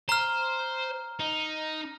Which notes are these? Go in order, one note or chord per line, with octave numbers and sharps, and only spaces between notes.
C5 A#5 F6
D#4